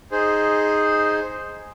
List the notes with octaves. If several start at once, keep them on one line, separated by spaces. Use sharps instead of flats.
D#4 G#4 C5